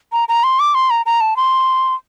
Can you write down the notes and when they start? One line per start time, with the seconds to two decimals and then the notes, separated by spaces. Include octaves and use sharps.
0.12 A#5
0.29 A#5
0.44 C6
0.60 D6
0.75 C6
0.90 A#5
1.06 A#5
1.21 A5
1.37 C6